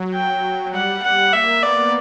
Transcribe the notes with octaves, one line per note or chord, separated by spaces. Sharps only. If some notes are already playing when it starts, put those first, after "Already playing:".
Already playing: F#3
G5
G3 F#5
F#5
A#3 E5
B3 D5